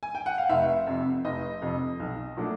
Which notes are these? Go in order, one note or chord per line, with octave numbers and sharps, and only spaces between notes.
G#5
G5
F#5
F5
F1 E5
F2 C3
F1 D#5
F2 C3
B1
A#2 F#3 A3 D4